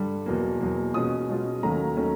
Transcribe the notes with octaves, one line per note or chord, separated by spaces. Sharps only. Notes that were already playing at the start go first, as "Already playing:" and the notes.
Already playing: G2 D3 G3
E2 B2 F#3 A#3
E2 B2 F#3 A#3
B2 G#3 C#4 F4 D#6
B2 G#3 C#4 F4
D#2 D#3 F#3 A3 C#4 A#5
D#3 F#3 A3 C#4